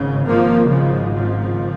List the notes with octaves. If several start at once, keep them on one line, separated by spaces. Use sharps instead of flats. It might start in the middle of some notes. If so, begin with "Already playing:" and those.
Already playing: G#1 G#2 C#3
F3 A#3
C#3 F3
C#3 F3